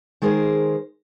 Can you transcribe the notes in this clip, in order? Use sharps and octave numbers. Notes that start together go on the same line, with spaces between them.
D#3 G#3 G#4 A#4 C5